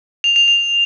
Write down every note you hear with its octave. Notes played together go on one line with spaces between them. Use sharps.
F7
F7
F7